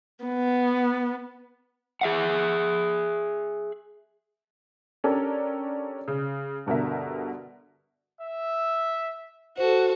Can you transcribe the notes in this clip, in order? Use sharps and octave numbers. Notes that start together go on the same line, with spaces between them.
B3
G#4 E5 F#5
C#4 D4 G4 A4 A#4 C#5
C#3
G2 B2 D3 A#4 E5
E5
F#4 A4 C5